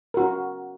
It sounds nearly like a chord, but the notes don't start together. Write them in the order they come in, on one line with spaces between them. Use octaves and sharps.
A#4 F#4 C#4